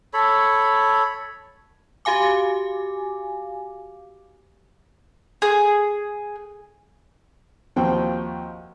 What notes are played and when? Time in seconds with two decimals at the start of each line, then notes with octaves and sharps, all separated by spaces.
0.13 A4 C#5 B5
2.05 F#4 G4 F5 G#5 D6
5.42 G#4
7.76 D#2 F3 C4 F#4 G5